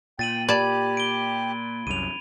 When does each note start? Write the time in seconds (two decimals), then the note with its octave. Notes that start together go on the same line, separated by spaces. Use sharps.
0.19 A#2 G5 A6 D#7 F#7
0.49 G4 D5 A5 B5 G#6
0.97 D7 G7
1.87 C2 F#2 D#7 F7